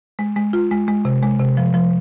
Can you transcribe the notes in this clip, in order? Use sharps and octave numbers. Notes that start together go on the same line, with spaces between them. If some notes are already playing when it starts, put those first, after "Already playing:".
G#3
G#3
F4
G#3
G#3
C3
G#3
C3
F3
F3